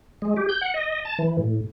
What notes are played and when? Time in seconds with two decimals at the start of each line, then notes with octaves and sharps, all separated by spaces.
0.22 G#3
0.36 G4
0.49 G6
0.61 F#5
0.74 D#5
1.05 A5
1.19 E3
1.38 A2